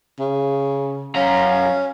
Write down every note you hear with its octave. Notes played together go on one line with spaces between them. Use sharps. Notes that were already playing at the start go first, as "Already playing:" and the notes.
C#3
F#2 C#4 F5 A#5